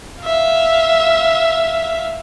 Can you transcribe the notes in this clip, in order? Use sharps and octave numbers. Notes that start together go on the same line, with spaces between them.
E5 F5